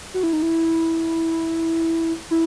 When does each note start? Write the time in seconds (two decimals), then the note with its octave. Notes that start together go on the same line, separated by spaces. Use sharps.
0.14 F#4
0.23 E4
0.33 D#4
0.42 E4
2.31 E4